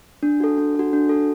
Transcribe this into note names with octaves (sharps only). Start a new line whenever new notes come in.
D4
F#4 A4
D4
F#4 A4
D4
F#4 A4